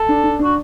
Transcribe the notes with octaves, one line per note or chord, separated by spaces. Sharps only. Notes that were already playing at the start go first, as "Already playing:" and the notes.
Already playing: A4
D4
D4
D4 F#4